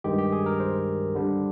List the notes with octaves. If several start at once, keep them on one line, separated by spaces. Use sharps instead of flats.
G2 D#3 G#3 G4
G4
G#4
A#4
C5
D3 G3 D4